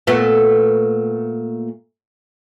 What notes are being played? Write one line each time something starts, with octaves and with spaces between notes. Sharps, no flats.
A#2 A3 B3